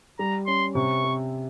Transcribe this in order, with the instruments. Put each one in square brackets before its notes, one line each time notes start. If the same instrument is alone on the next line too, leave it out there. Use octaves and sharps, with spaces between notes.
[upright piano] G3 [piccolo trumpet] A#5
[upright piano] C#4 [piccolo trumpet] C6
[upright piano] C3 [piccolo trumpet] C#6
[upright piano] C4